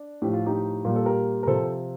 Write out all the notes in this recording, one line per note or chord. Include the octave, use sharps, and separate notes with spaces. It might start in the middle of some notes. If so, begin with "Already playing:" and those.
Already playing: D4
A2 F3 G4
F4
D#4 G4
A#2 G3 A#4
A4
G4 A#4
A#4
C3 F3 A4 C5